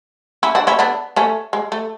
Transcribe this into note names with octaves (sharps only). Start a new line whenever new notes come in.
C#4 E4
D4 F#4
C#4 E4
B3 D4
A3 C#4
G#3
A3